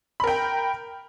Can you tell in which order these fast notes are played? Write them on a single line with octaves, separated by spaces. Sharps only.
B5 A#4 G5